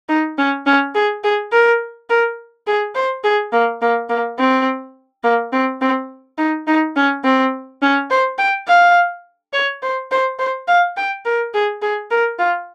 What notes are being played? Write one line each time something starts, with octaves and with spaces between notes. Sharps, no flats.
D#4
C#4
C#4
G#4
G#4
A#4
A#4
G#4
C5
G#4
A#3
A#3
A#3
C4
A#3
C4
C4
D#4
D#4
C#4
C4
C#4
C5
G5
F5
C#5
C5
C5
C5
F5
G5
A#4
G#4
G#4
A#4
F4